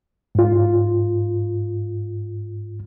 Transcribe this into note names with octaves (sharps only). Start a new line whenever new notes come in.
G#2 F4